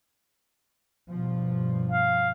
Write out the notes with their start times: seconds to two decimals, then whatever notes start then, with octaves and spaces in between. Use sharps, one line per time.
1.09 G2 B2 F3
1.92 F5